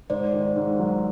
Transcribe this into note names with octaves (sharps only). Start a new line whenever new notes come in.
G#2 C5 D5
D#3
G#2
F#3